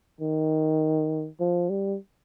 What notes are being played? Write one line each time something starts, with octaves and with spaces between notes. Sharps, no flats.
D#3
F3
G3